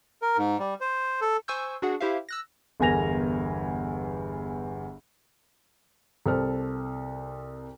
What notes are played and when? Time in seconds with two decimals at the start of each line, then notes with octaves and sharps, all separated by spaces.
0.22 A#4
0.37 G#2
0.59 G3
0.81 C5
1.21 A4
1.48 C5 G#5 C#6 E6 G6
1.82 D4 F#4 G#4 F#5
2.00 E4 G4 C5 E5 F5
2.29 E6 F#6 A#6
2.80 G1 E2 A#4 G#5 A#6 F7
6.26 C2 A4 C5 F6